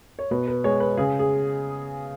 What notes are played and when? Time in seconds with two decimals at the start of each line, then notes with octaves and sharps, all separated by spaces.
0.19 C#5
0.31 B2 B4
0.48 B4
0.64 G#3 C#5
0.80 B4
0.97 C#3 G#4
1.19 G#4